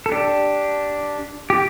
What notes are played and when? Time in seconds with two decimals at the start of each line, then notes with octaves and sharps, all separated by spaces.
0.06 A4
0.12 D4 G4
1.50 G4